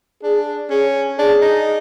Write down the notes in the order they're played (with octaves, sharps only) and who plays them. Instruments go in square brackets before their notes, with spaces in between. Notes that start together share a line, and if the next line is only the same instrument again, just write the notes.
[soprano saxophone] D4 [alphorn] G#4
[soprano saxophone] C#4 [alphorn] G#4
[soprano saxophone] D4 [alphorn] G#4
[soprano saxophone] D#4